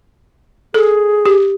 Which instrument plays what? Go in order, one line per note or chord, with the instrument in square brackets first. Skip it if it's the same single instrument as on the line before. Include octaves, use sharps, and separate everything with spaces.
[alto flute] G#4 [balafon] A4
[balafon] G4